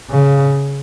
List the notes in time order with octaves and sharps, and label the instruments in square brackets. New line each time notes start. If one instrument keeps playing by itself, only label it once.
[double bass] C#3